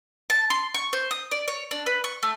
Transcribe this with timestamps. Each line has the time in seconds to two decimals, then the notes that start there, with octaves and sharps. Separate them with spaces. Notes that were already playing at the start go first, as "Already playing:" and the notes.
0.30 A5
0.50 C6
0.74 C#6
0.93 C5
1.11 D#6
1.31 D5
1.48 C#5
1.71 D4
1.86 B4
2.04 C#6
2.23 A3